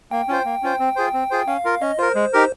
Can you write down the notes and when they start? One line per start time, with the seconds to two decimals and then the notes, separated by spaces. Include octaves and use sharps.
0.11 A#3 G5
0.28 C#4 F4 C5
0.45 A#3
0.63 C#4 F4 C5
0.79 C4
0.96 F4 G#4 C5
1.14 C4
1.30 F4 G#4 C5
1.47 C#4 F5
1.65 F4 A#4
1.82 C#4 D#5
1.99 F4 A#4 C5
2.15 G#3
2.33 D#4 G4 A#4